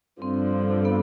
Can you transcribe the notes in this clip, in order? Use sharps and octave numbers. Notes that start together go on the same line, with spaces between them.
G2 D3 F3 C4
B3